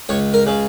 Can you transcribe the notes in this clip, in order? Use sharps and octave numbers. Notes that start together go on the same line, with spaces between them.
C#2 C#5
A#4
C#3